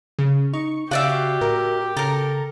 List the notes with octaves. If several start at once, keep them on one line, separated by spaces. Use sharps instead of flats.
C#3
D#4 C#6
C#3 F#4 G4 D5 E5 F5
A2 A#4
C#3 A4 A#4 A#5